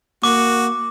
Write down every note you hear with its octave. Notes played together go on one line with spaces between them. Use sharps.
A#3 F#4 D6